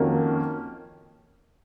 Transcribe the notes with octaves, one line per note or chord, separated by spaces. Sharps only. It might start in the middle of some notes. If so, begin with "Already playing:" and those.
Already playing: F2 D#3 A#3 C#4 F#4